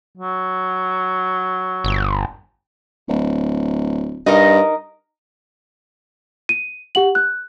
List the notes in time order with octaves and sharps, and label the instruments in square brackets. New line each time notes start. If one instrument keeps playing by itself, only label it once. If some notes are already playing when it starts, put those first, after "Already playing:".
[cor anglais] F#3
[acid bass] G1
[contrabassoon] D1
[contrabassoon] G2 [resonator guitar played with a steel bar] D#4 A#4 D#5
[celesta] D#7
G4 F#5 F#7
F#6